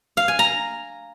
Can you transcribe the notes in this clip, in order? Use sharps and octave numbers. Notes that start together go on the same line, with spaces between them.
F5
G#5
A#5